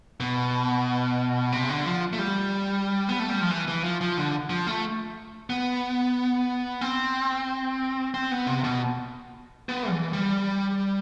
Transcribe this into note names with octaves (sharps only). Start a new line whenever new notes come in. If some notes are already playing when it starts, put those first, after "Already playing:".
B2
C3
D3
F3
A3
G3
B3
A3
G3
F3
E3
E3
F3
F3
D3
F3
A3
B3
C4
C4
B3
C3
B2
B3
E3
G3